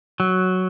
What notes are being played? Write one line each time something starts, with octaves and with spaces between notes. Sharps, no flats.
F#3